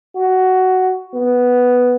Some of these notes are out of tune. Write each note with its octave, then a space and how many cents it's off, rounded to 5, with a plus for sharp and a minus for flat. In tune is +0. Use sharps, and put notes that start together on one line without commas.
F#4 +10
B3 +0